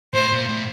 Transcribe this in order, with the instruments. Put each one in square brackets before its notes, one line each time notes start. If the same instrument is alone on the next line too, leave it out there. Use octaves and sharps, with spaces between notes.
[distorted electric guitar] A2 [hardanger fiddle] C5
[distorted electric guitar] A#2
A2